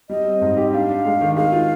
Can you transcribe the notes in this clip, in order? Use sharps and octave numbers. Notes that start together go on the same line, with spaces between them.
G3 D#5
C4
G#2
G4
D4 F5
D4
G#3
D#3
G#3 F5
F4